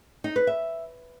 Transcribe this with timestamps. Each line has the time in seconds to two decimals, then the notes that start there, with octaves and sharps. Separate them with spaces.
0.24 D#4
0.36 B4
0.47 E5